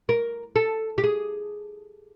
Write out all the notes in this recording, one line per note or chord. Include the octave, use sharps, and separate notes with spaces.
A#4
A4
G4
G#4